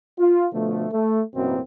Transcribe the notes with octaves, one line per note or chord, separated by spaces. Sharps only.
F4
B2 D3 F3 A3
A3
A1 F#2 B2 E3 A#3 C4